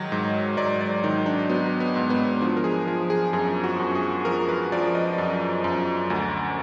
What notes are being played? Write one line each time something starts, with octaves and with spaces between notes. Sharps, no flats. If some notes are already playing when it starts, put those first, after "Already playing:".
Already playing: G#2 D#3 F#3
G#2
G#2 D5
D5
D#3 D#4
D4
F#3 B3
B3
G#2
B3
F3 D4
A#4
G#4
F3
G#4
F#2 G#4
F#4
F#2
G#4
F3 A#4
B4
F3 D5
D#5
F#2
F#2
D2